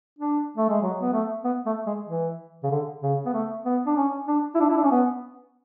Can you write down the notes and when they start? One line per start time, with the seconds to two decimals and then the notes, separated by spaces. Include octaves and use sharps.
0.18 D4
0.57 A3
0.69 G#3
0.82 F#3
1.01 B3
1.13 A3
1.44 B3
1.66 A3
1.86 G#3
2.08 E3
2.63 C#3
2.71 D3
3.03 C#3
3.26 B3
3.33 A3
3.65 B3
3.86 D4
3.97 C#4
4.28 D4
4.55 E4
4.60 D4
4.70 E4
4.77 D4
4.84 C#4
4.91 B3